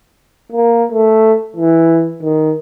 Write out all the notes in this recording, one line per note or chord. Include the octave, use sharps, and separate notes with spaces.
A#3
A3
E3
D#3